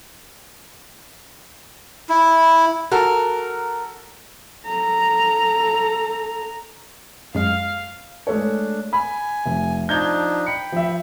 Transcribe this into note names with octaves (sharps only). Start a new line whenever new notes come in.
E4
F#4 A4 A#4
A4 A#5
F#2 G#3 F5
G#3 A3 D4 C#5
G#5 B5
F1
F3 D4 D#4 G6 G#6 G7
G5 B5 C#7
F3 E5